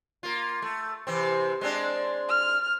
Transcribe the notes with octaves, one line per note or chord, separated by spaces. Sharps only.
A#3 F4
A3
C3 E3 C4
G#3 C4 D4
F6